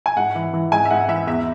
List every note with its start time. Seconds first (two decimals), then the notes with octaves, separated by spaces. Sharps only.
0.06 G#5
0.16 G#2 F#5
0.35 E3
0.54 E3
0.72 G#2 G#5
0.85 E5
0.90 G#2 F#5
1.08 E3 E5
1.27 E2 E5